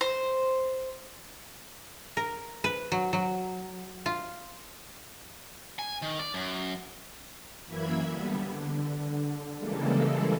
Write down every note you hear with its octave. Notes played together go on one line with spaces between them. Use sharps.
C5
A#4
B4
F#3
F#3
F4
G#5
D#3
D5
F#2
F#2 E3 A#3 E5 B5 G#6
D3 G3 B3
D3
C#3 E3 G3 G#3 A#3 A4